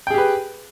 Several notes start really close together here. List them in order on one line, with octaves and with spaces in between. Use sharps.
G5 G#4 G4 B4